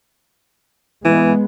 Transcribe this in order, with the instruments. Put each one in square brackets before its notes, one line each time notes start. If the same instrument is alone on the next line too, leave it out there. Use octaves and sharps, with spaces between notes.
[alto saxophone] E3 [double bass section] G#3 B3